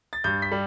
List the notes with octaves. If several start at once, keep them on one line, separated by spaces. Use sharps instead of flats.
A6
G2 G6
B6
G3